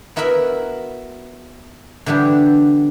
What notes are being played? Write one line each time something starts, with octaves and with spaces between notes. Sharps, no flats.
B3 E4 F#4 A#4 E5 B5
D3 E3 G3 B3 D4